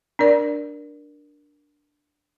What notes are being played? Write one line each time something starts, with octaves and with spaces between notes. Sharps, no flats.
D4 A#4 D5